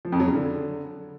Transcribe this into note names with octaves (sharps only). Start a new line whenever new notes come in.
F3
F2
F#3
C#3
D3